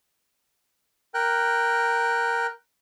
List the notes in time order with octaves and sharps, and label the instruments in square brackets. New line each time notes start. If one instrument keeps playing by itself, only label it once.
[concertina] A#4 G5 F#6